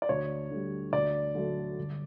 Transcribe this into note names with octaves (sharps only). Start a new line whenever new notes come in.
D5
D2 C#5
D3 G3
D2 D5
D3 F#3 A3
G1